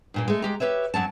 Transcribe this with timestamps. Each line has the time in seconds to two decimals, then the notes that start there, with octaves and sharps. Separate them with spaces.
0.14 G2 A#2 A#3
0.28 G#3 A3
0.42 G#3 G4 A#5
0.60 G4 G#4 B4 C#5 E5
0.94 F#2 F#3 C#4 A5